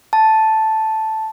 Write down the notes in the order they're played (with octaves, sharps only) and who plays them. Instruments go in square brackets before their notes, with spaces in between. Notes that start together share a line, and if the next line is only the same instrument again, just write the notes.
[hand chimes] A5